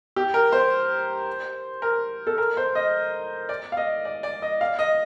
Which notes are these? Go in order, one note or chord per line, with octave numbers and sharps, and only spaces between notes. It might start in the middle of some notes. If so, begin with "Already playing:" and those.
G4
A#4
C5
A#4
A4
A#4
C5
D#5
D5
F5
D#5
D5
D5
D#5
F5
D#5